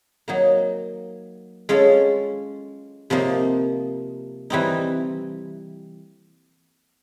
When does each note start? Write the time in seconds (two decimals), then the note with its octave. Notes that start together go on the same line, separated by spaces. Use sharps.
0.28 F#3 A#3 D#4
1.69 G#3 C#4 F4 A4
3.10 C3 F3 A#3 D#4
4.50 E3 G3 C4 D#4